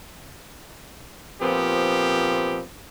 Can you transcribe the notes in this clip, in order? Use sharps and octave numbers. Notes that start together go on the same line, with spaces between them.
A#2 F3 B3 C4 G4